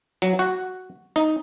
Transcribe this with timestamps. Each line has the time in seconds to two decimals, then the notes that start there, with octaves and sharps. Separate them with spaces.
0.22 F#3
0.39 F#4
1.16 D#4